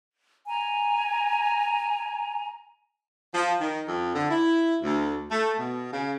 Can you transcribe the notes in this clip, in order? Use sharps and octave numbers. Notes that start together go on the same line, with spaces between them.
G#5 A#5
F3
D#3
F2
D3
E4
D2
A3
B2
C#3